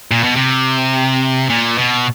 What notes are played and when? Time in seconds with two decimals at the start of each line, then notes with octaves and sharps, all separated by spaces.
0.11 A#2
0.24 B2
0.36 C3
1.50 A#2
1.78 B2